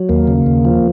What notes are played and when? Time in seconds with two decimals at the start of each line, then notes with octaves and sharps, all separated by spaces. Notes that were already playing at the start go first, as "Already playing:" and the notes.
Already playing: F#3
0.09 D#2 A#3
0.27 C#3
0.46 D#2
0.65 F3